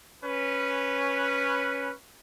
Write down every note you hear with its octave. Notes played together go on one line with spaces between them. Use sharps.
C#4 B4